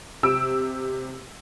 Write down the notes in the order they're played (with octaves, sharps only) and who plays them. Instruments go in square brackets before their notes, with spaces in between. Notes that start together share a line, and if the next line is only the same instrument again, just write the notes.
[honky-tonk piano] C3 E6 D7